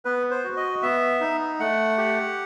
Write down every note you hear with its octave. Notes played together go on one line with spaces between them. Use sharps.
B3 B4
C5
F#4
D#5
B3 E5
D#4
A3 F#5
G4